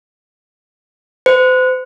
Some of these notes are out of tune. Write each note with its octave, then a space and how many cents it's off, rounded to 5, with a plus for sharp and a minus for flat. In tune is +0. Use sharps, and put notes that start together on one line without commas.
C5 -40